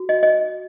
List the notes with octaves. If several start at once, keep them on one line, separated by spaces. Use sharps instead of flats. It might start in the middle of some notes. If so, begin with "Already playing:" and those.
Already playing: F#4
D#5
D#5